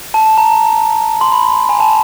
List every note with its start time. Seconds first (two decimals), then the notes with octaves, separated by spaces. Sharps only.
0.14 A5
0.26 A5
0.38 A#5
1.21 C6
1.32 B5
1.69 G#5
1.80 A5